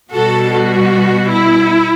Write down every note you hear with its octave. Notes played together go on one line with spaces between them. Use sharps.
B2 G3 F#4 A4
F#4
E4